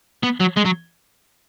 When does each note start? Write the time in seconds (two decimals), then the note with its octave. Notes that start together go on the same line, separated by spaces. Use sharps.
0.24 B3
0.41 F#3
0.57 G#3
0.66 F#3